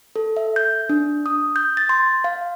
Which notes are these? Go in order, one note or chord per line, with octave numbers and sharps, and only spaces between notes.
A4
E5
G6
D4
D#6
G6
A6
C6
F5